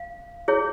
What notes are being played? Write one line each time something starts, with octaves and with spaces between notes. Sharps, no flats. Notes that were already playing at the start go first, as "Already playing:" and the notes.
Already playing: F5
E4 G#4 C#5